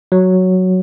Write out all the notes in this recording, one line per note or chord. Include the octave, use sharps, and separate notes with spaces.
F#3